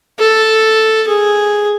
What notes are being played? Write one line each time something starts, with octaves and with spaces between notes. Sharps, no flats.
A4
G#4